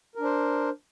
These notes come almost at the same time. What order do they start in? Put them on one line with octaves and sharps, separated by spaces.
A#4 D4 C5